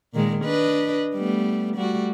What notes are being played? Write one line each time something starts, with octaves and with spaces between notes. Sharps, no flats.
A#2 D#3 G#3
D4 B4 D#5
G3 A3 B3
G3 A3 F#4